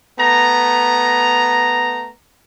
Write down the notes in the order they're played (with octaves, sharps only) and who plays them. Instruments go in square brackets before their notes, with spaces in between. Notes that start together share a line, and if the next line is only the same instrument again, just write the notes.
[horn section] A3 B3 A#5